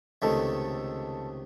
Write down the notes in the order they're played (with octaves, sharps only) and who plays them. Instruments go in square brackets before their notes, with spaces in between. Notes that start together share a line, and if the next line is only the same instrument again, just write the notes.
[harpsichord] C#2 C3 D#3 A3 [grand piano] A4